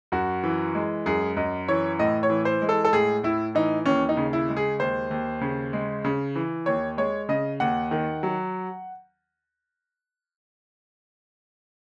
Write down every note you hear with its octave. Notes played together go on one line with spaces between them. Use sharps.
F#2 F#4
E3
G#3
F#2 G#4
F#2 D#5
E3 C#5
A2 D#5
C#5
E3
C5
G#3
A4
A4
A2 G#4
A2 E4
E3 D#4
D#2 C#4
D#4
C#3
E4
G#3
G#4
D#2 C5
D#2
C#3
G#3
C#3
E3
D#2 C#5
G#3 C#5
C#3 D#5
D#2 F#5
D#3
F#3